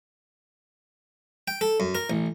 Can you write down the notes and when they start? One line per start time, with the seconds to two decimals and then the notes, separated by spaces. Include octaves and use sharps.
1.48 G5
1.61 A4
1.80 F#2
1.95 A#4
2.10 A1